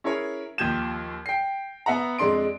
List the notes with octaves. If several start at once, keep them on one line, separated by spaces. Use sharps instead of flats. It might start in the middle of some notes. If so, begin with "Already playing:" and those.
C#4 E4 G#4 A#4 C#5
D#2 F3 G4 G6 G#6 E7
G5 C7
B3 E5 F#5 A#5
F2 G#3 D4 C6 D7